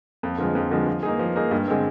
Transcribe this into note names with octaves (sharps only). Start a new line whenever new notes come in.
F2
D3 F3 G#3
F2
D3 F3 G#3
F3
A#3 D#4 G#4
F3
A#3 D#4 G#4
G2
D3 G#3 C4